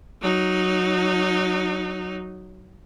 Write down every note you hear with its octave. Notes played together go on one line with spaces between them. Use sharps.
F#3 D#4